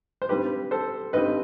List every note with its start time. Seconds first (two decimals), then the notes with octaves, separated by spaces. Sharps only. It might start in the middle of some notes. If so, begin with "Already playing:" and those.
0.22 C5
0.29 G2 D#3 G3 C4 G4 B4
0.71 A4 C5
1.13 G2 D#3 G3 C4 B4 D#5